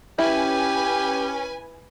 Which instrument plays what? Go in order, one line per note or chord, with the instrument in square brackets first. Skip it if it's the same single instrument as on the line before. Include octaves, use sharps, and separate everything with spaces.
[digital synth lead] C#4 [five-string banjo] E4 [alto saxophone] G4 [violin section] B4 G#5